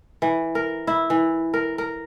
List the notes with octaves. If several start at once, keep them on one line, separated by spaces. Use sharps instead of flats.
E3
A#4
E4
E3
A#4
A#4